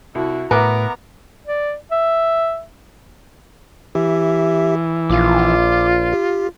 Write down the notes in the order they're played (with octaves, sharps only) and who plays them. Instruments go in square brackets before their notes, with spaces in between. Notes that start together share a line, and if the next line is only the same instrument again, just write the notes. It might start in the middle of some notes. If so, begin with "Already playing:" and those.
[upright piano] C2 [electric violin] E4 F#4
[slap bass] A2 [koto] B3 [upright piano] A#4 E5 D6 [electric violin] A#5
[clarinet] D5
E5
[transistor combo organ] E3 [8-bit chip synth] G4 E5
[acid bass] A#1 [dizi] F4 [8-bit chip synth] D6
[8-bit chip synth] G4